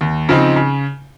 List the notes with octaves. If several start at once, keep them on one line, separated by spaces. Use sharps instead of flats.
D#2
C#3 F3 C4 D#4
C#3